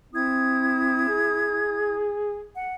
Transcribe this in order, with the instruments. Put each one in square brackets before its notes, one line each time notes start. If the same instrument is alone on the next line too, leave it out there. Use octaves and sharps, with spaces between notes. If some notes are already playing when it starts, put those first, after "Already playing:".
[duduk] C4 [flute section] E4 D#6 G#6
[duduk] G#4
[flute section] F#5